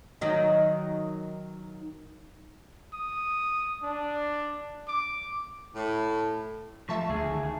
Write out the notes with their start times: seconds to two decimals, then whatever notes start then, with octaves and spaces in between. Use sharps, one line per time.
0.21 D#3 F#3 D#4
2.93 D#6
3.83 D4
4.88 D6
5.76 A2
6.89 F3 A3 E5 A5 C#6
7.10 D2 G#4
7.30 C#2 D#3